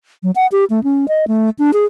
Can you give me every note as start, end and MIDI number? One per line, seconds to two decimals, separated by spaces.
0.23 0.31 54
0.36 0.47 78
0.52 0.65 67
0.70 0.83 57
0.84 1.06 61
1.08 1.25 75
1.28 1.50 57
1.59 1.71 62
1.73 1.85 68